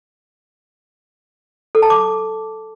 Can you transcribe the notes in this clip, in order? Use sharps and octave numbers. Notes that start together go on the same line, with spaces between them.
A4
A5
D6